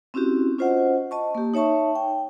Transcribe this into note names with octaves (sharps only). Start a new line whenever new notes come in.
C4 C#4 E4 F#4 G4
C#4 F4 C5 D#5 F#5
D#5 A5 C#6
A#3 G4
D#4 C#5 E5 A5 C#6
G5